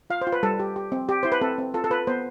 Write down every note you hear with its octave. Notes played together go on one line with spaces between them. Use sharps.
F4 F5
C5
F4
B4
G3 A4
G4
G4
C4
G4
E4 C5
B4
C4 A4
C4
F4 A4
A4
F4 B4
B3 C5